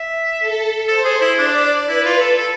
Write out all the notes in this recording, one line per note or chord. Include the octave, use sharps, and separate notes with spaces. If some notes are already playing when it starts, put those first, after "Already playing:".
Already playing: E5
A4
A4 C5
G#4
E4
D4 D5
E4 B4
F4
A4
A4